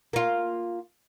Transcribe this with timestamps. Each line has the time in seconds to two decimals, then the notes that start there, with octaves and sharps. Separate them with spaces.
0.13 A#3 F4